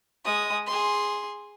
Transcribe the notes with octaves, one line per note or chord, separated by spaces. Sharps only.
G#3 D#6
G#4 C6